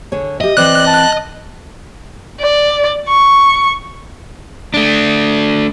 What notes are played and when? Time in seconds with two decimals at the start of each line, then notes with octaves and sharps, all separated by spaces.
0.12 D3 G#4 C#5
0.41 G4 D#5 E5
0.57 E3 C4 E4 D5 F#6
0.87 A5
2.41 D5
3.08 C#6
4.74 A3 D4